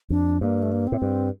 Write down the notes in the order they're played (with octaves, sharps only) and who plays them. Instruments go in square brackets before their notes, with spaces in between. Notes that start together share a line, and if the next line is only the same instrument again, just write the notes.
[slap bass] F2 [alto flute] D4
[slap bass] G2 [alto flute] A#3
[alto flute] A3
A#3
[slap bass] A2 [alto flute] C4
[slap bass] G2